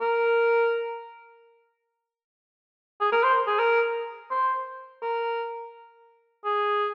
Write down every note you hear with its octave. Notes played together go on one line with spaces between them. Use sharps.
A#4
G#4
A#4
C5
G#4
A#4
C5
A#4
G#4